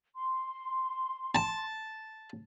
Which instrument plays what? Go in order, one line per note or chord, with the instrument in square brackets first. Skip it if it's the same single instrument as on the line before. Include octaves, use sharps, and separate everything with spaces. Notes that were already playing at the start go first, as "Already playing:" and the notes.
[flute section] C6
[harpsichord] A5